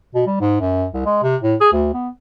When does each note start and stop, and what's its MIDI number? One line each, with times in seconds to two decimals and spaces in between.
0.15 0.25 47
0.27 0.39 55
0.40 0.58 44
0.61 0.85 42
0.93 1.05 36
1.06 1.21 56
1.23 1.36 48
1.42 1.55 45
1.61 1.70 68
1.73 1.91 38
1.94 2.09 59